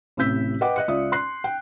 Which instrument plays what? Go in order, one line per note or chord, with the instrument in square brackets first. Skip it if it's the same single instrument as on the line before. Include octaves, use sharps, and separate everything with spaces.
[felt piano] A1 A2 C3 E6 G6 B6
B4 D#5 F#5 G5 D6
D#5 F#6 C#7
C#2 F4 D5 E5 D#6
C6 F#6 C7
G5